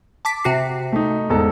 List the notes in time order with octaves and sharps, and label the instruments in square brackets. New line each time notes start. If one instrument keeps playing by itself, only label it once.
[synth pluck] A5 D6 B6
C3 F#4 C7
[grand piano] A3 D#4
E1 G#2 A4